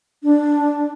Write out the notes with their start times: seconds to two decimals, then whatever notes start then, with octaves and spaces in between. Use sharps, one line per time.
0.23 D4